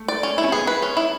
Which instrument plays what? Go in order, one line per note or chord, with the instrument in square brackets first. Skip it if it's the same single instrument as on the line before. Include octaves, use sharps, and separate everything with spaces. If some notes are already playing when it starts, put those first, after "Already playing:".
Already playing: [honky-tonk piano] A3
[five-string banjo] D5
C#4
E4
[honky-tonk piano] C#4
[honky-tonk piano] B3 [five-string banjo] G#4
[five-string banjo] B4
C#4
E4